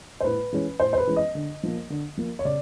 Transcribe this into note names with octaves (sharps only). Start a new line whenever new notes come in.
C5
A2 B4
E3 G#3 C#4
A2 C5
C5
B4
E3 G#3 C#4
D#5
D3
F3 A#3
D3
F3 A#3
C#5
C#3 D5